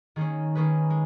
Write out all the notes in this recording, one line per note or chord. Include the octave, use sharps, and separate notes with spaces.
D#3 A#3 C#4 G#4
D#3 A#3 C#4 G#4 B4
G#3